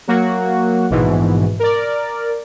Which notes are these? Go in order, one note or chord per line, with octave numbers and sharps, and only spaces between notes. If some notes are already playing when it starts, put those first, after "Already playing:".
F#3 A#3 F#4
A#1 G#2 B2 E3
A#4 D5